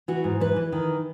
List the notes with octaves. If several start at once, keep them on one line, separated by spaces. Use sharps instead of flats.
E3 F#4
G#2
E3 B4
E3
D#3